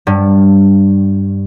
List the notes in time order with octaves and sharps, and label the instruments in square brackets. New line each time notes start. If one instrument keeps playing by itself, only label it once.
[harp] G2